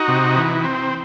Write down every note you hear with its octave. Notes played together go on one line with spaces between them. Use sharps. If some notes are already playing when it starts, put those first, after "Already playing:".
Already playing: D#4 F#4
C3
E3
C4